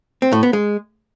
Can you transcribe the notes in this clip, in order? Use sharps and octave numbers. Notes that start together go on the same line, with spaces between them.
C4
A2
B3
G#3